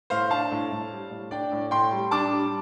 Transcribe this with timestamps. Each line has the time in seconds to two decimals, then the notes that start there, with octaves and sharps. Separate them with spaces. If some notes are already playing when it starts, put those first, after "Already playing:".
0.10 A2 C5 F5
0.30 D4 F5 A5
0.51 A2
0.71 A2
0.91 G3
1.11 A2
1.31 D4 D5 G5
1.52 A2
1.71 A2 G5 C6
1.91 G3
2.11 D4 A5 D6
2.32 G3